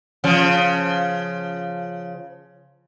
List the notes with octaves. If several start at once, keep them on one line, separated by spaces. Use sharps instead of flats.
C#3 F3